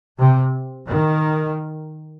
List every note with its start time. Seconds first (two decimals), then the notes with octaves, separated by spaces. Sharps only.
0.18 C3
0.88 D#3